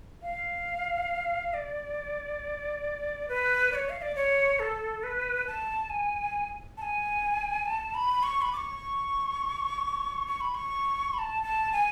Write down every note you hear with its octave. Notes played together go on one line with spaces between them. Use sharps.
F5
D5
B4
D5
C#5
F5
D5
C#5
A4
B4
A5
G#5
A5
G#5
A5
B5
C#6
B5
D6
C#6
C#6
B5
C#6
B5
A5
A5
G#5